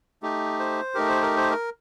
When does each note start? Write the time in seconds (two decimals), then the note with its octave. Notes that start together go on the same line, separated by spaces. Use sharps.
0.23 A3 D#4 G4
0.59 C5
0.95 A3 D#4 G4 A#4
1.09 C5
1.22 A#4
1.37 C5
1.50 A#4